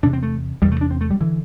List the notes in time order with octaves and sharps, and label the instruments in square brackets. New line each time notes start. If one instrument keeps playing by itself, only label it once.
[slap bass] E2 C3 D4
C4
A3
E2 C3 G3
A3
D4
C4
A3
G3
D3 E3